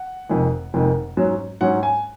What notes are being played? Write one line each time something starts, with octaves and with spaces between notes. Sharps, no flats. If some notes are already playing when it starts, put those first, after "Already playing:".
Already playing: F#5
F1 F2 D#3 G#3
F1 F2 D#3 G#3
G#2 F#3 C#4
G#2 F#3 C#4 F#5
G#5